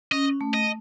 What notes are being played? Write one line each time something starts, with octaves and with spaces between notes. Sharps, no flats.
C#4 D#5
A3
D#5